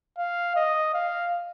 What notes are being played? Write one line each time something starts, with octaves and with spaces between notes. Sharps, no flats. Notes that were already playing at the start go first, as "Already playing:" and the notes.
F5
D#5
F5